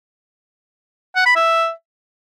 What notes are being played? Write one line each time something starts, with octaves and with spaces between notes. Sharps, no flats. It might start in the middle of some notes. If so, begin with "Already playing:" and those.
F#5
B5
E5